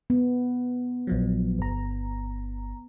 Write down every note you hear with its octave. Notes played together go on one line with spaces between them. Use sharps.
B3
A#1 F3 F#3
G1 A#5